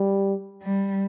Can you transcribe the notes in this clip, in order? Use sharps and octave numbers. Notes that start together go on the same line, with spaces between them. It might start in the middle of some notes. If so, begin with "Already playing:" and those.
Already playing: G3
G3